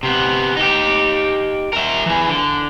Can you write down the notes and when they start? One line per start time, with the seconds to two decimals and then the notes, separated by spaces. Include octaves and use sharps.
0.03 C3 B3
0.57 D#4 G4
1.73 A#4 E5
2.06 E3 G#4
2.27 D3